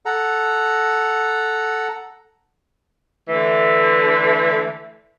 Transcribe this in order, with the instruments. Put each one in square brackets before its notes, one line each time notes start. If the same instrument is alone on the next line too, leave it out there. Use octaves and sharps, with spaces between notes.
[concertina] A4 F#5 A#5
[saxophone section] D3 E3 A3